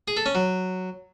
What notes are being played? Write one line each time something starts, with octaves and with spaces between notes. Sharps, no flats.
G#4
A4
C#4
F#3